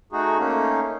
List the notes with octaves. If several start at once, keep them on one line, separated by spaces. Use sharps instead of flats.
A3 D#4 F#4 G#4
A3 A#3 C#4 D#4